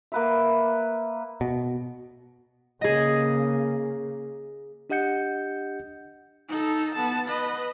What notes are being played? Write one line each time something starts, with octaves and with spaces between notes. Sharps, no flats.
A#3 B4 E5
B2
C#3 A#3 G#4 D#5
D4 G4 D#5 F#5 G6 C#7
D#4 A4
B3 A5
B4 D#5